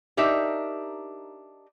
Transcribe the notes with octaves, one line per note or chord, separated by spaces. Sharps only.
D4 D#4 G4 A#4 E5